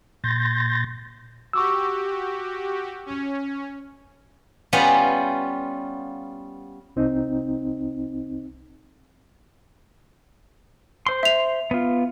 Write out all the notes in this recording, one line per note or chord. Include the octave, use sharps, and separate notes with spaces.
A#2 C6 G6 A6 A#6
F#4 G4 C#6 D6 E6
C#4
G3 B3 C#4 F4 F#5
C2 C4 D#4
C5 C6
E5 F7
B3 F4